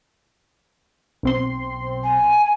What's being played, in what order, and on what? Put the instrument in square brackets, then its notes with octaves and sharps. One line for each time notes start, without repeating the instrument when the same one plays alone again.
[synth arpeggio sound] B1 C4 C6
[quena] G#5